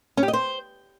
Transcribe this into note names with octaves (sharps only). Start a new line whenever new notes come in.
C#4
G4
D#5
C5